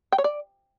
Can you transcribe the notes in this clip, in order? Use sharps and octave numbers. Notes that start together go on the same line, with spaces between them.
G5
C#5
D5